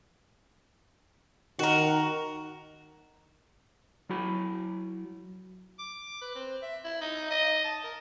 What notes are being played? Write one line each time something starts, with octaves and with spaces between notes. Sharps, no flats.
D#3 F#4 A#4
F#3 E4 F#4 B5
D6
B4
C4
E5
E4
D#4
D#5
A5
A#4